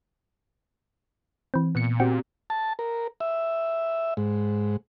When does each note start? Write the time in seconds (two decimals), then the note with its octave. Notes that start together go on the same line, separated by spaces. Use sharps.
1.54 E3 C4
1.75 A#2 B3 C#7
2.00 C4 F#4 G4
2.50 A5
2.79 A#4
3.20 E5
4.17 G#2